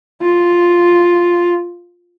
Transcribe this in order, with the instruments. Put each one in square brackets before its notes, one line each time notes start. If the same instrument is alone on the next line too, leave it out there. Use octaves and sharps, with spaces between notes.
[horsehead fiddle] F4